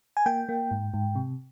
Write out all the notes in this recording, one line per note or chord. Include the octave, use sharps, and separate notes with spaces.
G#5
A#3 G5
A#3
G#2
G#2
C3